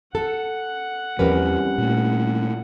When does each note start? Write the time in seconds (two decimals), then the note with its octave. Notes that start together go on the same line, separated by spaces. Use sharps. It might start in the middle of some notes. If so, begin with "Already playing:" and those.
0.15 A4 F#5
1.19 E2 F3 G3 C4 C#4 G4 A#4 B4
1.78 A#2 A3